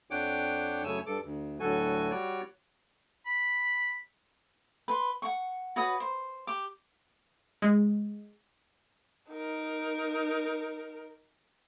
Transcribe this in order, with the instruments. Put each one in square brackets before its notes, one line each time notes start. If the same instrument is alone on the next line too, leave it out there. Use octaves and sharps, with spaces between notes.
[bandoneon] F2 D4 C#5 F#5 G5 D6
F#2 C#3 A3 C#5 G#5 E6
G2 A4 D6
D2
D2 A2 F#3 F#4 A4 G#5
G3 F#4 C#5 D5
[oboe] B5
[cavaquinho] B4 C6
F#5 C#6
F#4 B4 C#5 D#6
C5
G4 D6
[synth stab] G#3
[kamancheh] D#4 A#4